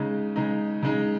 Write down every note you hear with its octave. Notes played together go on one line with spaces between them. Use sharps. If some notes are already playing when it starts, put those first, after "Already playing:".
Already playing: C#3 G#3 D#4
C#3 G#3 D#4
C#3 G#3 D#4